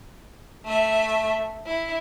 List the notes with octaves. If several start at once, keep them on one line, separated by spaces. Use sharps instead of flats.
A3 E5
E4